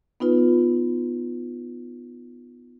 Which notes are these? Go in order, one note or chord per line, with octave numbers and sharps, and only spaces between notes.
B3 D#4 F4 B4